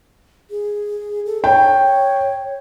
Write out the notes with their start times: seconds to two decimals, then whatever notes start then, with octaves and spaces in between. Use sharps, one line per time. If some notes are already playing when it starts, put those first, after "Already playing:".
0.50 G#4
1.26 A4
1.44 C#5 G5